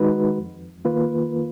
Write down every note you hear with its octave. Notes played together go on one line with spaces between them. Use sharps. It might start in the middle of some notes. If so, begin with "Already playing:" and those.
Already playing: D#3 G#3 D#4 F#4 B4
F2
D#3 A#3 F4 B4